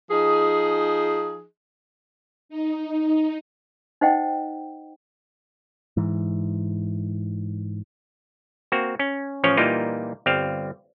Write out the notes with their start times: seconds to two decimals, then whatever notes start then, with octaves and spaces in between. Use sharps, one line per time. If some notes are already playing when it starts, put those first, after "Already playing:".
0.10 F3 D#4 G#4
2.49 D#4
4.01 D#4 C5 D#5 F#5 G5
5.97 G#2 E3
8.72 A#3 C4 F#4
8.99 C#4
9.43 A1 F3 C#4 C#5
9.57 A#2 E3 G3 A#3 D#4 F4
10.26 G1 G3 C4 F5